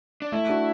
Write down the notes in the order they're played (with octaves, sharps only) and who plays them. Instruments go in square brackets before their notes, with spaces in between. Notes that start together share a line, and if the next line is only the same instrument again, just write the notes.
[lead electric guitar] D4
[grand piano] A3 [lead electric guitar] E4
[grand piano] D4 F#4